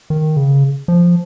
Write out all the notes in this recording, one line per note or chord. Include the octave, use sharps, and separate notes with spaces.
D#3
C#3
F3